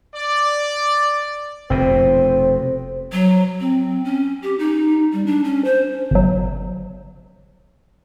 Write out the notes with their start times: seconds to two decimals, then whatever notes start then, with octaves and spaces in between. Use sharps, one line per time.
0.14 D5
1.70 F1 B2 C4 C5
3.12 F#3
3.60 C4
4.05 C#4
4.42 G4
4.59 D#4
5.13 G3
5.26 D4
5.44 C#4
5.64 C5
6.11 G1 F#3